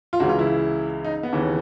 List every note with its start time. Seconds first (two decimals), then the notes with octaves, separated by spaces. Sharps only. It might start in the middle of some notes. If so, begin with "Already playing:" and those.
0.13 F4
0.20 C#2 C#3 E3 F#4
0.29 F4
0.39 E4
1.04 D#4
1.23 B3
1.33 D#2 C#3 E3